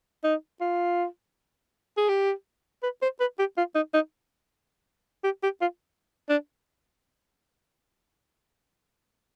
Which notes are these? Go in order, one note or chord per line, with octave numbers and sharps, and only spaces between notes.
D#4
F4
G#4
G4
B4
C5
B4
G4
F4
D#4
D#4
G4
G4
F4
D4